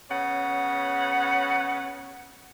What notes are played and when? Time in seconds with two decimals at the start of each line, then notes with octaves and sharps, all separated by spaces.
0.10 C#3 B3 C#5 F#5